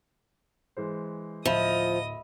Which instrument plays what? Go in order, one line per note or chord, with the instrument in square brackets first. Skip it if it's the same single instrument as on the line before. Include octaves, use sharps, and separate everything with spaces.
[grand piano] E3 G#3 C5
[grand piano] D1 [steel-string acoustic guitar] F3 [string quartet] D#5 D#6 [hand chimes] E5 B5